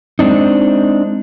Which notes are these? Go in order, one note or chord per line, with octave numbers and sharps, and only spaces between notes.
G#3 C4 D4 D#4